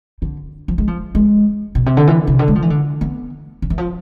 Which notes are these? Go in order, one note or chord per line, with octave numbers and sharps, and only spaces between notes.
D3
F3
G#3
F3
G#3
B2
C3
D3
E3
C3
D3
G#3
F3
E3
D3
B3
D3
E3
F3